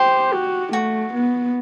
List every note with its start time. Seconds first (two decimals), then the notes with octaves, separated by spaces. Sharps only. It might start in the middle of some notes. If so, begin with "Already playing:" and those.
Already playing: G4 C5
0.33 F#4
0.73 A3 F#4
1.13 B3